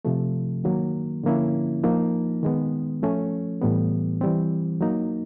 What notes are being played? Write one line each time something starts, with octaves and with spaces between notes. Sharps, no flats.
C3 F3 A3
D#3 F#3 A#3
D3 F3 A#3 C#4 E4
F3 A#3 D#4
D#3 G#3 B3
F3 A3 C#4
A2 E3 G3 B3
E3 G3 C4
F#3 A#3 D#4